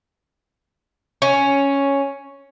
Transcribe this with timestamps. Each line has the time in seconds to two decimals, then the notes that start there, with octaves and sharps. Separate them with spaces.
1.22 C#4